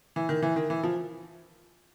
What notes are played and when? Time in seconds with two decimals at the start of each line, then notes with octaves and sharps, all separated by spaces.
0.16 E3
0.29 D#3
0.42 E3
0.56 D#3
0.70 E3
0.83 F3